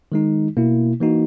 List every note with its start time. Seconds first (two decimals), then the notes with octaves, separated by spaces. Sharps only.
0.12 D#3 G#3 D#4
0.57 B2 A#3 E4
1.00 E3 A#3 D#4 F#4